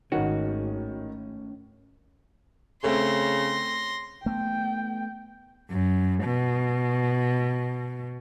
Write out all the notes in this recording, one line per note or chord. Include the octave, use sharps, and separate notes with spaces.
G#1 A2 D#3 C#4 D#4 F#4
C#3 A3 C4 C6 A#6
A3 B3 G5
F#2
B2